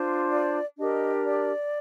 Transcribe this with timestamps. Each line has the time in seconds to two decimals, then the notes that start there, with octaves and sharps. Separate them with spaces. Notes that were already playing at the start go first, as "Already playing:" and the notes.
Already playing: D4 F4 C5
0.32 D5
0.78 D4 G4 A#4 D#5
1.24 D5